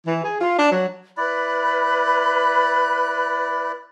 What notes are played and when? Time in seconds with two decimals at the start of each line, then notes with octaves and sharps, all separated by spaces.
0.07 E3
0.24 G#4
0.41 F4
0.59 D4
0.71 F#3
1.17 E4 B4 D5 B5 F#6